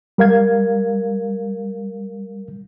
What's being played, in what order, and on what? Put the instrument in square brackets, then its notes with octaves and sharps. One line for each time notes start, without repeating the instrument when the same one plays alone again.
[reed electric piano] G3 A#4 F5 G#6